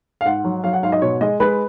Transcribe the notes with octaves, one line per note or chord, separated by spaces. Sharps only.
F5
G#2 F#5
F#3
F#3 F5
F#5
G#2 F5
D#5
B2 C#5
G#3 D#5
G#3 B4